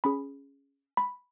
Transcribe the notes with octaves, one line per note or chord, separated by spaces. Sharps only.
C#4 G#4 B5
B5